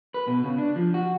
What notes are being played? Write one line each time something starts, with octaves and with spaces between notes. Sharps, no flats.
B4
B2
C#3
D4
F3
F#4